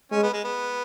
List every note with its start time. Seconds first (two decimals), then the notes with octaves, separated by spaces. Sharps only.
0.11 G#3 C#4
0.23 B3
0.33 G#3
0.44 B3